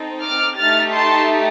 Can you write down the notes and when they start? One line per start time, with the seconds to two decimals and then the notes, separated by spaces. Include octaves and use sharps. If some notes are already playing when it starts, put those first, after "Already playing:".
Already playing: C4 D#4 A4
0.22 D6 F6
0.58 A3 D#4 G4 F6 A6
0.93 A5 C6